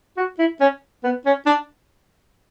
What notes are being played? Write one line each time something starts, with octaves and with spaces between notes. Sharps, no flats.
F#4
E4
C#4
B3
C#4
D4